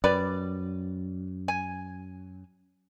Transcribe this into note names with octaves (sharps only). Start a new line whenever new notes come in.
F#2 G3 B4 D5
G#5